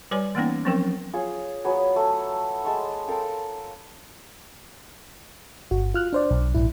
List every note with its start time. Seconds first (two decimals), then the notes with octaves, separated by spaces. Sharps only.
0.11 G3 B4 C#5 D5 G#5
0.35 E3 A#3 B3 C#4 D#4
0.65 F3 F#3 C4 C#4 A#4
1.13 F4 G#4 C#5 F5
1.64 F#3 B3 G#4
1.96 A3
2.65 G#3 A5 C6 C#6
3.08 A4 A#4 F5 G5
5.71 G1 F#4
5.94 F4 F6 F#6
6.13 D4 C5 D5
6.31 B1
6.55 A#1 G#2 E4